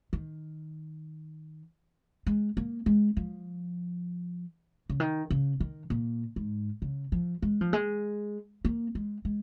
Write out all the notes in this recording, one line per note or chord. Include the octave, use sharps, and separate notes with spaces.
D#3
G#3
A#3
G#3
F3
C#3
D#3
C#3
D#3
A#2
G#2
C#3
F3
G#3
F3
G#3
A#3
G#3
G#3